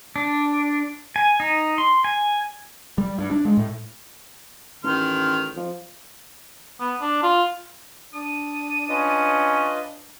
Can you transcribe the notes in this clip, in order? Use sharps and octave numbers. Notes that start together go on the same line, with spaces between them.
D4
G#5
D#4
C6
G#5
G3
G2
D4
G#3
A2
A1 D#3 C6 F6
F3
B3
D4
F4
D4 D#6
C#4 F4 B4 D#5